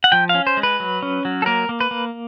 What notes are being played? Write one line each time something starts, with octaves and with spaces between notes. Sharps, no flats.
F#5
F3 G5
F5
C#4
C5
G#3
B4
F#3
C#4
F#3
A4
A#3 A#4
A#3
B4
A#3